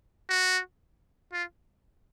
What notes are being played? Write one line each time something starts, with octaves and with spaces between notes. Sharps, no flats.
F#4
F4